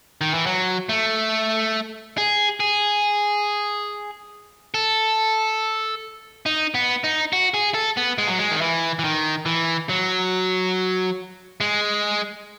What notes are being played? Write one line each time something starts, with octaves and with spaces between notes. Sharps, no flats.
D#3
E3
F#3
A3
G#4
G#4
A4
D#4
B3
D#4
F#4
G#4
A4
B3
G#3
F#3
G#3
D#3
E3
E3
D#3
E3
F#3
G#3